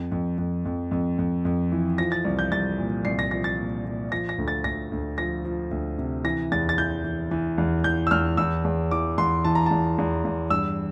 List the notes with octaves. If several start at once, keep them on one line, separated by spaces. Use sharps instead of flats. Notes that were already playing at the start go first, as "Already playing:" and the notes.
Already playing: F2
F2
F2
F2
F2
F2
F2
E3
F3 A#6
A6
C2
G6
C2 A6
A#2
C2 C7
A#6
F3 A#6
A6
A#2
A#2
F3 A#6
A#6
D2
A6
D2 A#6
D2
F3 A#6
F3
D2
C3
E3 A#6
E2 A6
A6
E3 G6
E3
E3
E2
E3 G6
E6
E2 F6
E2 E6
E2
E3 D6
E2 C6
E3 A5
A#5
E2 A5
E2
E2
G2 E6